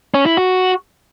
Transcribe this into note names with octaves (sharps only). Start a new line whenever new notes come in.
C#4
E4
F#4